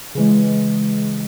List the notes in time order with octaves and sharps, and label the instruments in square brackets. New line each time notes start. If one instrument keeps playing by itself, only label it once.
[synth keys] C#3 E3 G#3